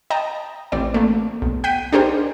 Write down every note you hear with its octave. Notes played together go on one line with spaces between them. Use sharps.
D#5 G5 A5 A#5
A1 C4 D5
A3 A#3
B1
F#5 G5 G6 B6 D#7
D4 D#4 G4 G#4 A#4 C5